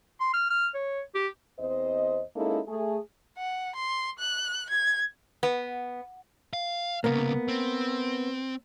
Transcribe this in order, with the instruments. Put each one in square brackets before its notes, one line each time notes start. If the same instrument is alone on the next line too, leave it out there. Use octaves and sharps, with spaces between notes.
[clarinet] C6
F6
F6
C#5
G4
[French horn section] E2 C4 C5 D#5
G#3 A#3 C#4 D#4 E4 A4
A3 G#4
[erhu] F#5
C6
F#6
G#6
[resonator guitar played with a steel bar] B3
[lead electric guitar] F5
[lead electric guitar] C2 C#3 [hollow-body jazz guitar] A#3 B3
[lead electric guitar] C4